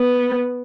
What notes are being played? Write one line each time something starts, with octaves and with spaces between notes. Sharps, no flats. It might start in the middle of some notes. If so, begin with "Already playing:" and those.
Already playing: B3